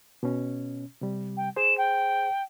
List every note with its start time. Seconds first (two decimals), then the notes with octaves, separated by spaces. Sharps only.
0.23 B2 C#4
1.01 C3 G3
1.36 G5
1.56 G#4 C5 E7
1.77 G5